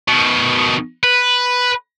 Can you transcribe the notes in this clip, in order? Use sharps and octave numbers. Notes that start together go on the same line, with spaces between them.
B2 D#3
B4